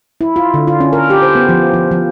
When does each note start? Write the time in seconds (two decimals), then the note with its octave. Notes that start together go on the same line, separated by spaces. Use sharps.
0.21 E4
0.36 F4
0.54 D3
0.67 F4
0.80 C#4
0.93 A#4
1.10 G4
1.22 C5
1.35 B3
1.49 F3
1.73 F3
1.91 F3